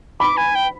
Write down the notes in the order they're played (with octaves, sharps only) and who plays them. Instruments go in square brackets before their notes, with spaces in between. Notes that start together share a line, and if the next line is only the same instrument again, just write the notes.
[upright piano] B5 [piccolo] D6
[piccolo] G#5
G5